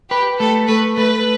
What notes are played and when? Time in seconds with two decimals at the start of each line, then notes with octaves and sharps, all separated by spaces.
0.11 G4 B4
0.40 A3 A4
0.69 A3 B4
0.97 A3 B4